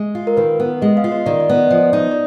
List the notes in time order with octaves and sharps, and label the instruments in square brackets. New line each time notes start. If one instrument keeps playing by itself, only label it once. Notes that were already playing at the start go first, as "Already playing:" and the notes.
Already playing: [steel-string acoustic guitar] G#3
F4
[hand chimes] A#4
[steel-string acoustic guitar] D#3 [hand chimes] B4
[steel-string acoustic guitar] B3
[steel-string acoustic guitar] G#3 [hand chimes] D#5
[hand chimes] F5
[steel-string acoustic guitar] F4
[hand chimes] D#5
[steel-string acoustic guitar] D#3 [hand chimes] D5
[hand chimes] D#5
[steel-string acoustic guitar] B3
[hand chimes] D5
[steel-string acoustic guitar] F3 [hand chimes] D#5
[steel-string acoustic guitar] D#4
[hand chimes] D5